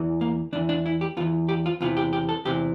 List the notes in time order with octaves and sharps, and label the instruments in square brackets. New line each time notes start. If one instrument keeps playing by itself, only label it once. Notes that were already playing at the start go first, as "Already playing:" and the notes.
Already playing: [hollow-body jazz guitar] E2 E3
A#3
E2 D4
E3
D4
E4
G4
E2 F4
E3
G4
F4
E2 C3 E3 F4
G4
G4
A4
E2 C3 E3 G4